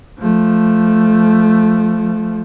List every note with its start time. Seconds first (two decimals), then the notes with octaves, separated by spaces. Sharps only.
0.19 F3 A3